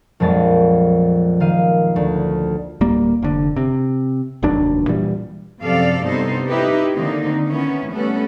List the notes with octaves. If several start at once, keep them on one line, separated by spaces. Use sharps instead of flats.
A#1 F2 F#3 G#3 A6
D#3 F5 D#7
D2
D1 G3 A#3
F1 D3
C3
F1 D#2 F#3 D4
A#2 E3 G3
F#2 C3 F3 A4 D5 F5
G2 C3 B3 D#4 A4 C5
D#4 E4 G4 B4
D3 D#3 A#3 C4 D#4
D#3 B3 C#4 E4
G3 A3 B3 C#4 A4